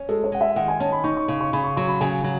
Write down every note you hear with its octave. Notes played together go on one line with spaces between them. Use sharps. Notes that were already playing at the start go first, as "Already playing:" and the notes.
Already playing: C#4
G#3 A4
C#5
G#3 F#5
E5
D#3 F#5
G#5
C#4 A5
B5
D#4 C#6
C#6
C#3 C#6
C#6
C#3 B5
C#6
F#3 C#6
B5
C#3 G#5
F#3